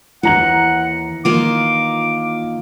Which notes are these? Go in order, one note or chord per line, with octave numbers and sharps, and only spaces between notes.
D#2 E3 F#5 A#5 F#7
D#3 A#3 F4 D6